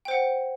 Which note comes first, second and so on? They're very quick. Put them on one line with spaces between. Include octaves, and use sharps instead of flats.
G5 C5 F#5